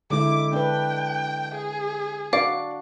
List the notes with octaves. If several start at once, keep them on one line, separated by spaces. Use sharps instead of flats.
D3 G#3 E4 D6
D4 B4 G5
G#4
D4 F#4 D5 F5